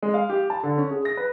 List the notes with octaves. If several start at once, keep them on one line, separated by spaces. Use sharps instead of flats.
G#3
F5
G4
A5
D3
C#4
G#4
A#6
B4